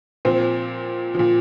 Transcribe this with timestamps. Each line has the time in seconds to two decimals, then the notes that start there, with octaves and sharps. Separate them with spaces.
0.25 A#2 F3 C4
1.15 A#2 F3